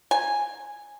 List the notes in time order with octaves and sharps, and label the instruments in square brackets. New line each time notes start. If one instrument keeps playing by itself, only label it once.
[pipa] G#5